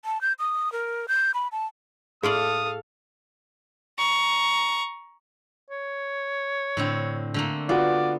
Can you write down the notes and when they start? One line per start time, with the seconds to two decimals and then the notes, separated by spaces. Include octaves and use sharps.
0.05 A5
0.21 G6
0.39 D#6
0.72 A#4
1.08 G6
1.34 B5
1.52 A5
2.23 A2 F4 G#4 A4 D5 F5 D#6
3.98 A#5 C#6
5.71 C#5
6.77 A2 D3 C4
7.34 D3 A3 A#3
7.69 B3 F4 F#4 D5